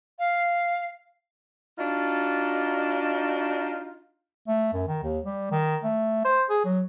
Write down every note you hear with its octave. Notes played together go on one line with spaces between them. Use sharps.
F5
D4 D#4 F4 F#4
A3
F#2
D#3
D#2
G3
D#3
A3
C5
G#4
F#3